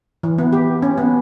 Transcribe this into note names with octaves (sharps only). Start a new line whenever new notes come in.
E3
B3
G4
C#4
B3